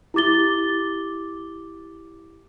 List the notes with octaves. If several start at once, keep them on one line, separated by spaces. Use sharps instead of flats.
E4 G4 D6 A6 G7